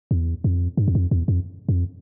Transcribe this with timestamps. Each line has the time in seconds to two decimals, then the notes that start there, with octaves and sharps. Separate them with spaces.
0.11 E2
0.44 F2
0.77 G2
0.88 E2
0.95 F2
1.11 E2
1.28 F2
1.69 F2